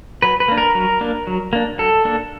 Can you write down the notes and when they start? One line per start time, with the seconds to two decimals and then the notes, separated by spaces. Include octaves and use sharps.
0.22 F#3 B4
0.40 B4
0.48 A#3 D4
0.58 A#4
0.75 F#3
1.01 A#3 D4
1.27 F#3
1.53 A#3 D4
1.78 F#3 A4
2.05 A#3 D4